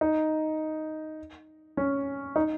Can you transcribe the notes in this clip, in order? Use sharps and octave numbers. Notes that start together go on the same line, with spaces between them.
D#4
C#4
D#4